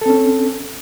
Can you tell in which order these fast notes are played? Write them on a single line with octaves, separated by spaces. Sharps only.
A4 C4 C#4